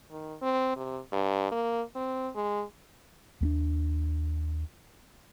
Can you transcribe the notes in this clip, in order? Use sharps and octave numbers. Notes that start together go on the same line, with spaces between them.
D#3
C4
C3
G2
A#3
C4
G#3
D#2 A#3 D4